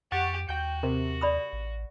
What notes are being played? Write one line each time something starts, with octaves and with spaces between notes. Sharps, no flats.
F2 G4 F#5 C#6 A6
D#2 F#4 G5 G6
C3 A#4
D5 B5 D#6
A1